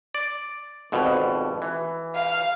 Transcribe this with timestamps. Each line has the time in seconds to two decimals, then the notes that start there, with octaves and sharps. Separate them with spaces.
0.15 D5
0.92 G#1 F2 B2
1.62 E3
2.15 F5